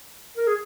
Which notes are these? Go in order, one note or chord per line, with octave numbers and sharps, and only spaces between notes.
A#4
G#4